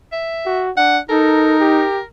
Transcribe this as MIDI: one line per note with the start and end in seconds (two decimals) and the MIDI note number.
0.12 0.61 76
0.46 0.71 66
0.77 1.00 62
0.77 0.98 78
1.09 1.84 63
1.09 1.57 69
1.09 2.04 70
1.60 2.01 67